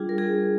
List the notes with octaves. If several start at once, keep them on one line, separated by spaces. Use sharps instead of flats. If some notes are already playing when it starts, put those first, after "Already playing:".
Already playing: G3 D4 F4 G#4
A#4
G#4